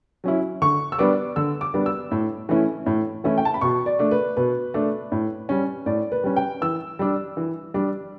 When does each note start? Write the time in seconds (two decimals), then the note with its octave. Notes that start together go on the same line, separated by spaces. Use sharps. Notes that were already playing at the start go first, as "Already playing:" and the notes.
0.24 F#3 C#4 E4
0.62 D3 C#6
0.92 E6
0.99 G3 B3 D4 D6
1.36 D3 E6
1.61 D6
1.74 G3 B3 D4
1.86 E6
2.11 A2
2.49 E3 A3 C#4 E4
2.86 A2
3.24 E3 A3 C#4 E4
3.38 G5
3.45 A5
3.54 B5
3.61 B2 C#6
3.86 D5
3.99 A3 D4
4.11 B4
4.37 B2 B4
4.74 A3 D4
5.12 A2
5.49 G3 C#4
5.86 A2 D5
6.12 B4
6.24 G3 C#4
6.36 G5
6.61 E3 E6
6.99 G3 D4
7.37 E3
7.74 G3 D4